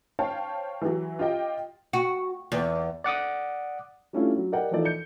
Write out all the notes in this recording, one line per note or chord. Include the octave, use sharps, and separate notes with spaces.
C5 C#5 F5 G5 A5
E3 F#3
F4 G4 D#5 G5
F#4
E2
D5 F#5 D6 D#6
G3 A3 C#4 D4 E4 F4
F#3
G4 A#4 D5 D#5 F#5 G5
E3 F3 D#4 F4 A4 D5
G6 C#7